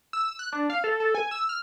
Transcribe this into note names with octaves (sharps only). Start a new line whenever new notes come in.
E6
F#6
D4
F5
A4
A4
G#5
E6
F6